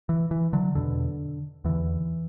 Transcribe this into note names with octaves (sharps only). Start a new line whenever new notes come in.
E3
E3
D3 F#3
E2 B2 D3
E2 D3 E3